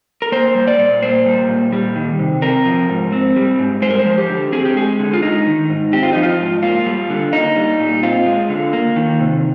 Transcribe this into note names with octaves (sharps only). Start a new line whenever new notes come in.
A#4
A#3 C5
G3
D5
A#2
A#3 C5
G3
A#2
G3
D#3
C3
C4 A#4
F3
G#2
C4
G3
G#2
G#3 C5
A#4
C5
F3
G4
D3
C4 G#4
G4
G#3 G#4
D3
F4
G#3 D#4
D#3
G#2
C4 G4
F4
F3 D#4
F4
G#2
A#3 F4
G3
D3
A#3 D#4
G3
A#2
C4 F4
G#3
D3
A#3
D#3
C3